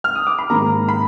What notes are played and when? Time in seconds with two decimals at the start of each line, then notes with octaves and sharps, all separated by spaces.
0.04 F6
0.15 D#6
0.27 D6
0.39 B5
0.50 G#2 D#3 A#3 A#5
0.89 B5